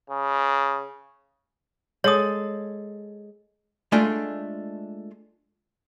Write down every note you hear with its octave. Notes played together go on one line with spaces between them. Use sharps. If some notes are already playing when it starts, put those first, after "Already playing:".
C#3
G#3 A4 C#5 D#6
G#3 A3 D4 F4 G#5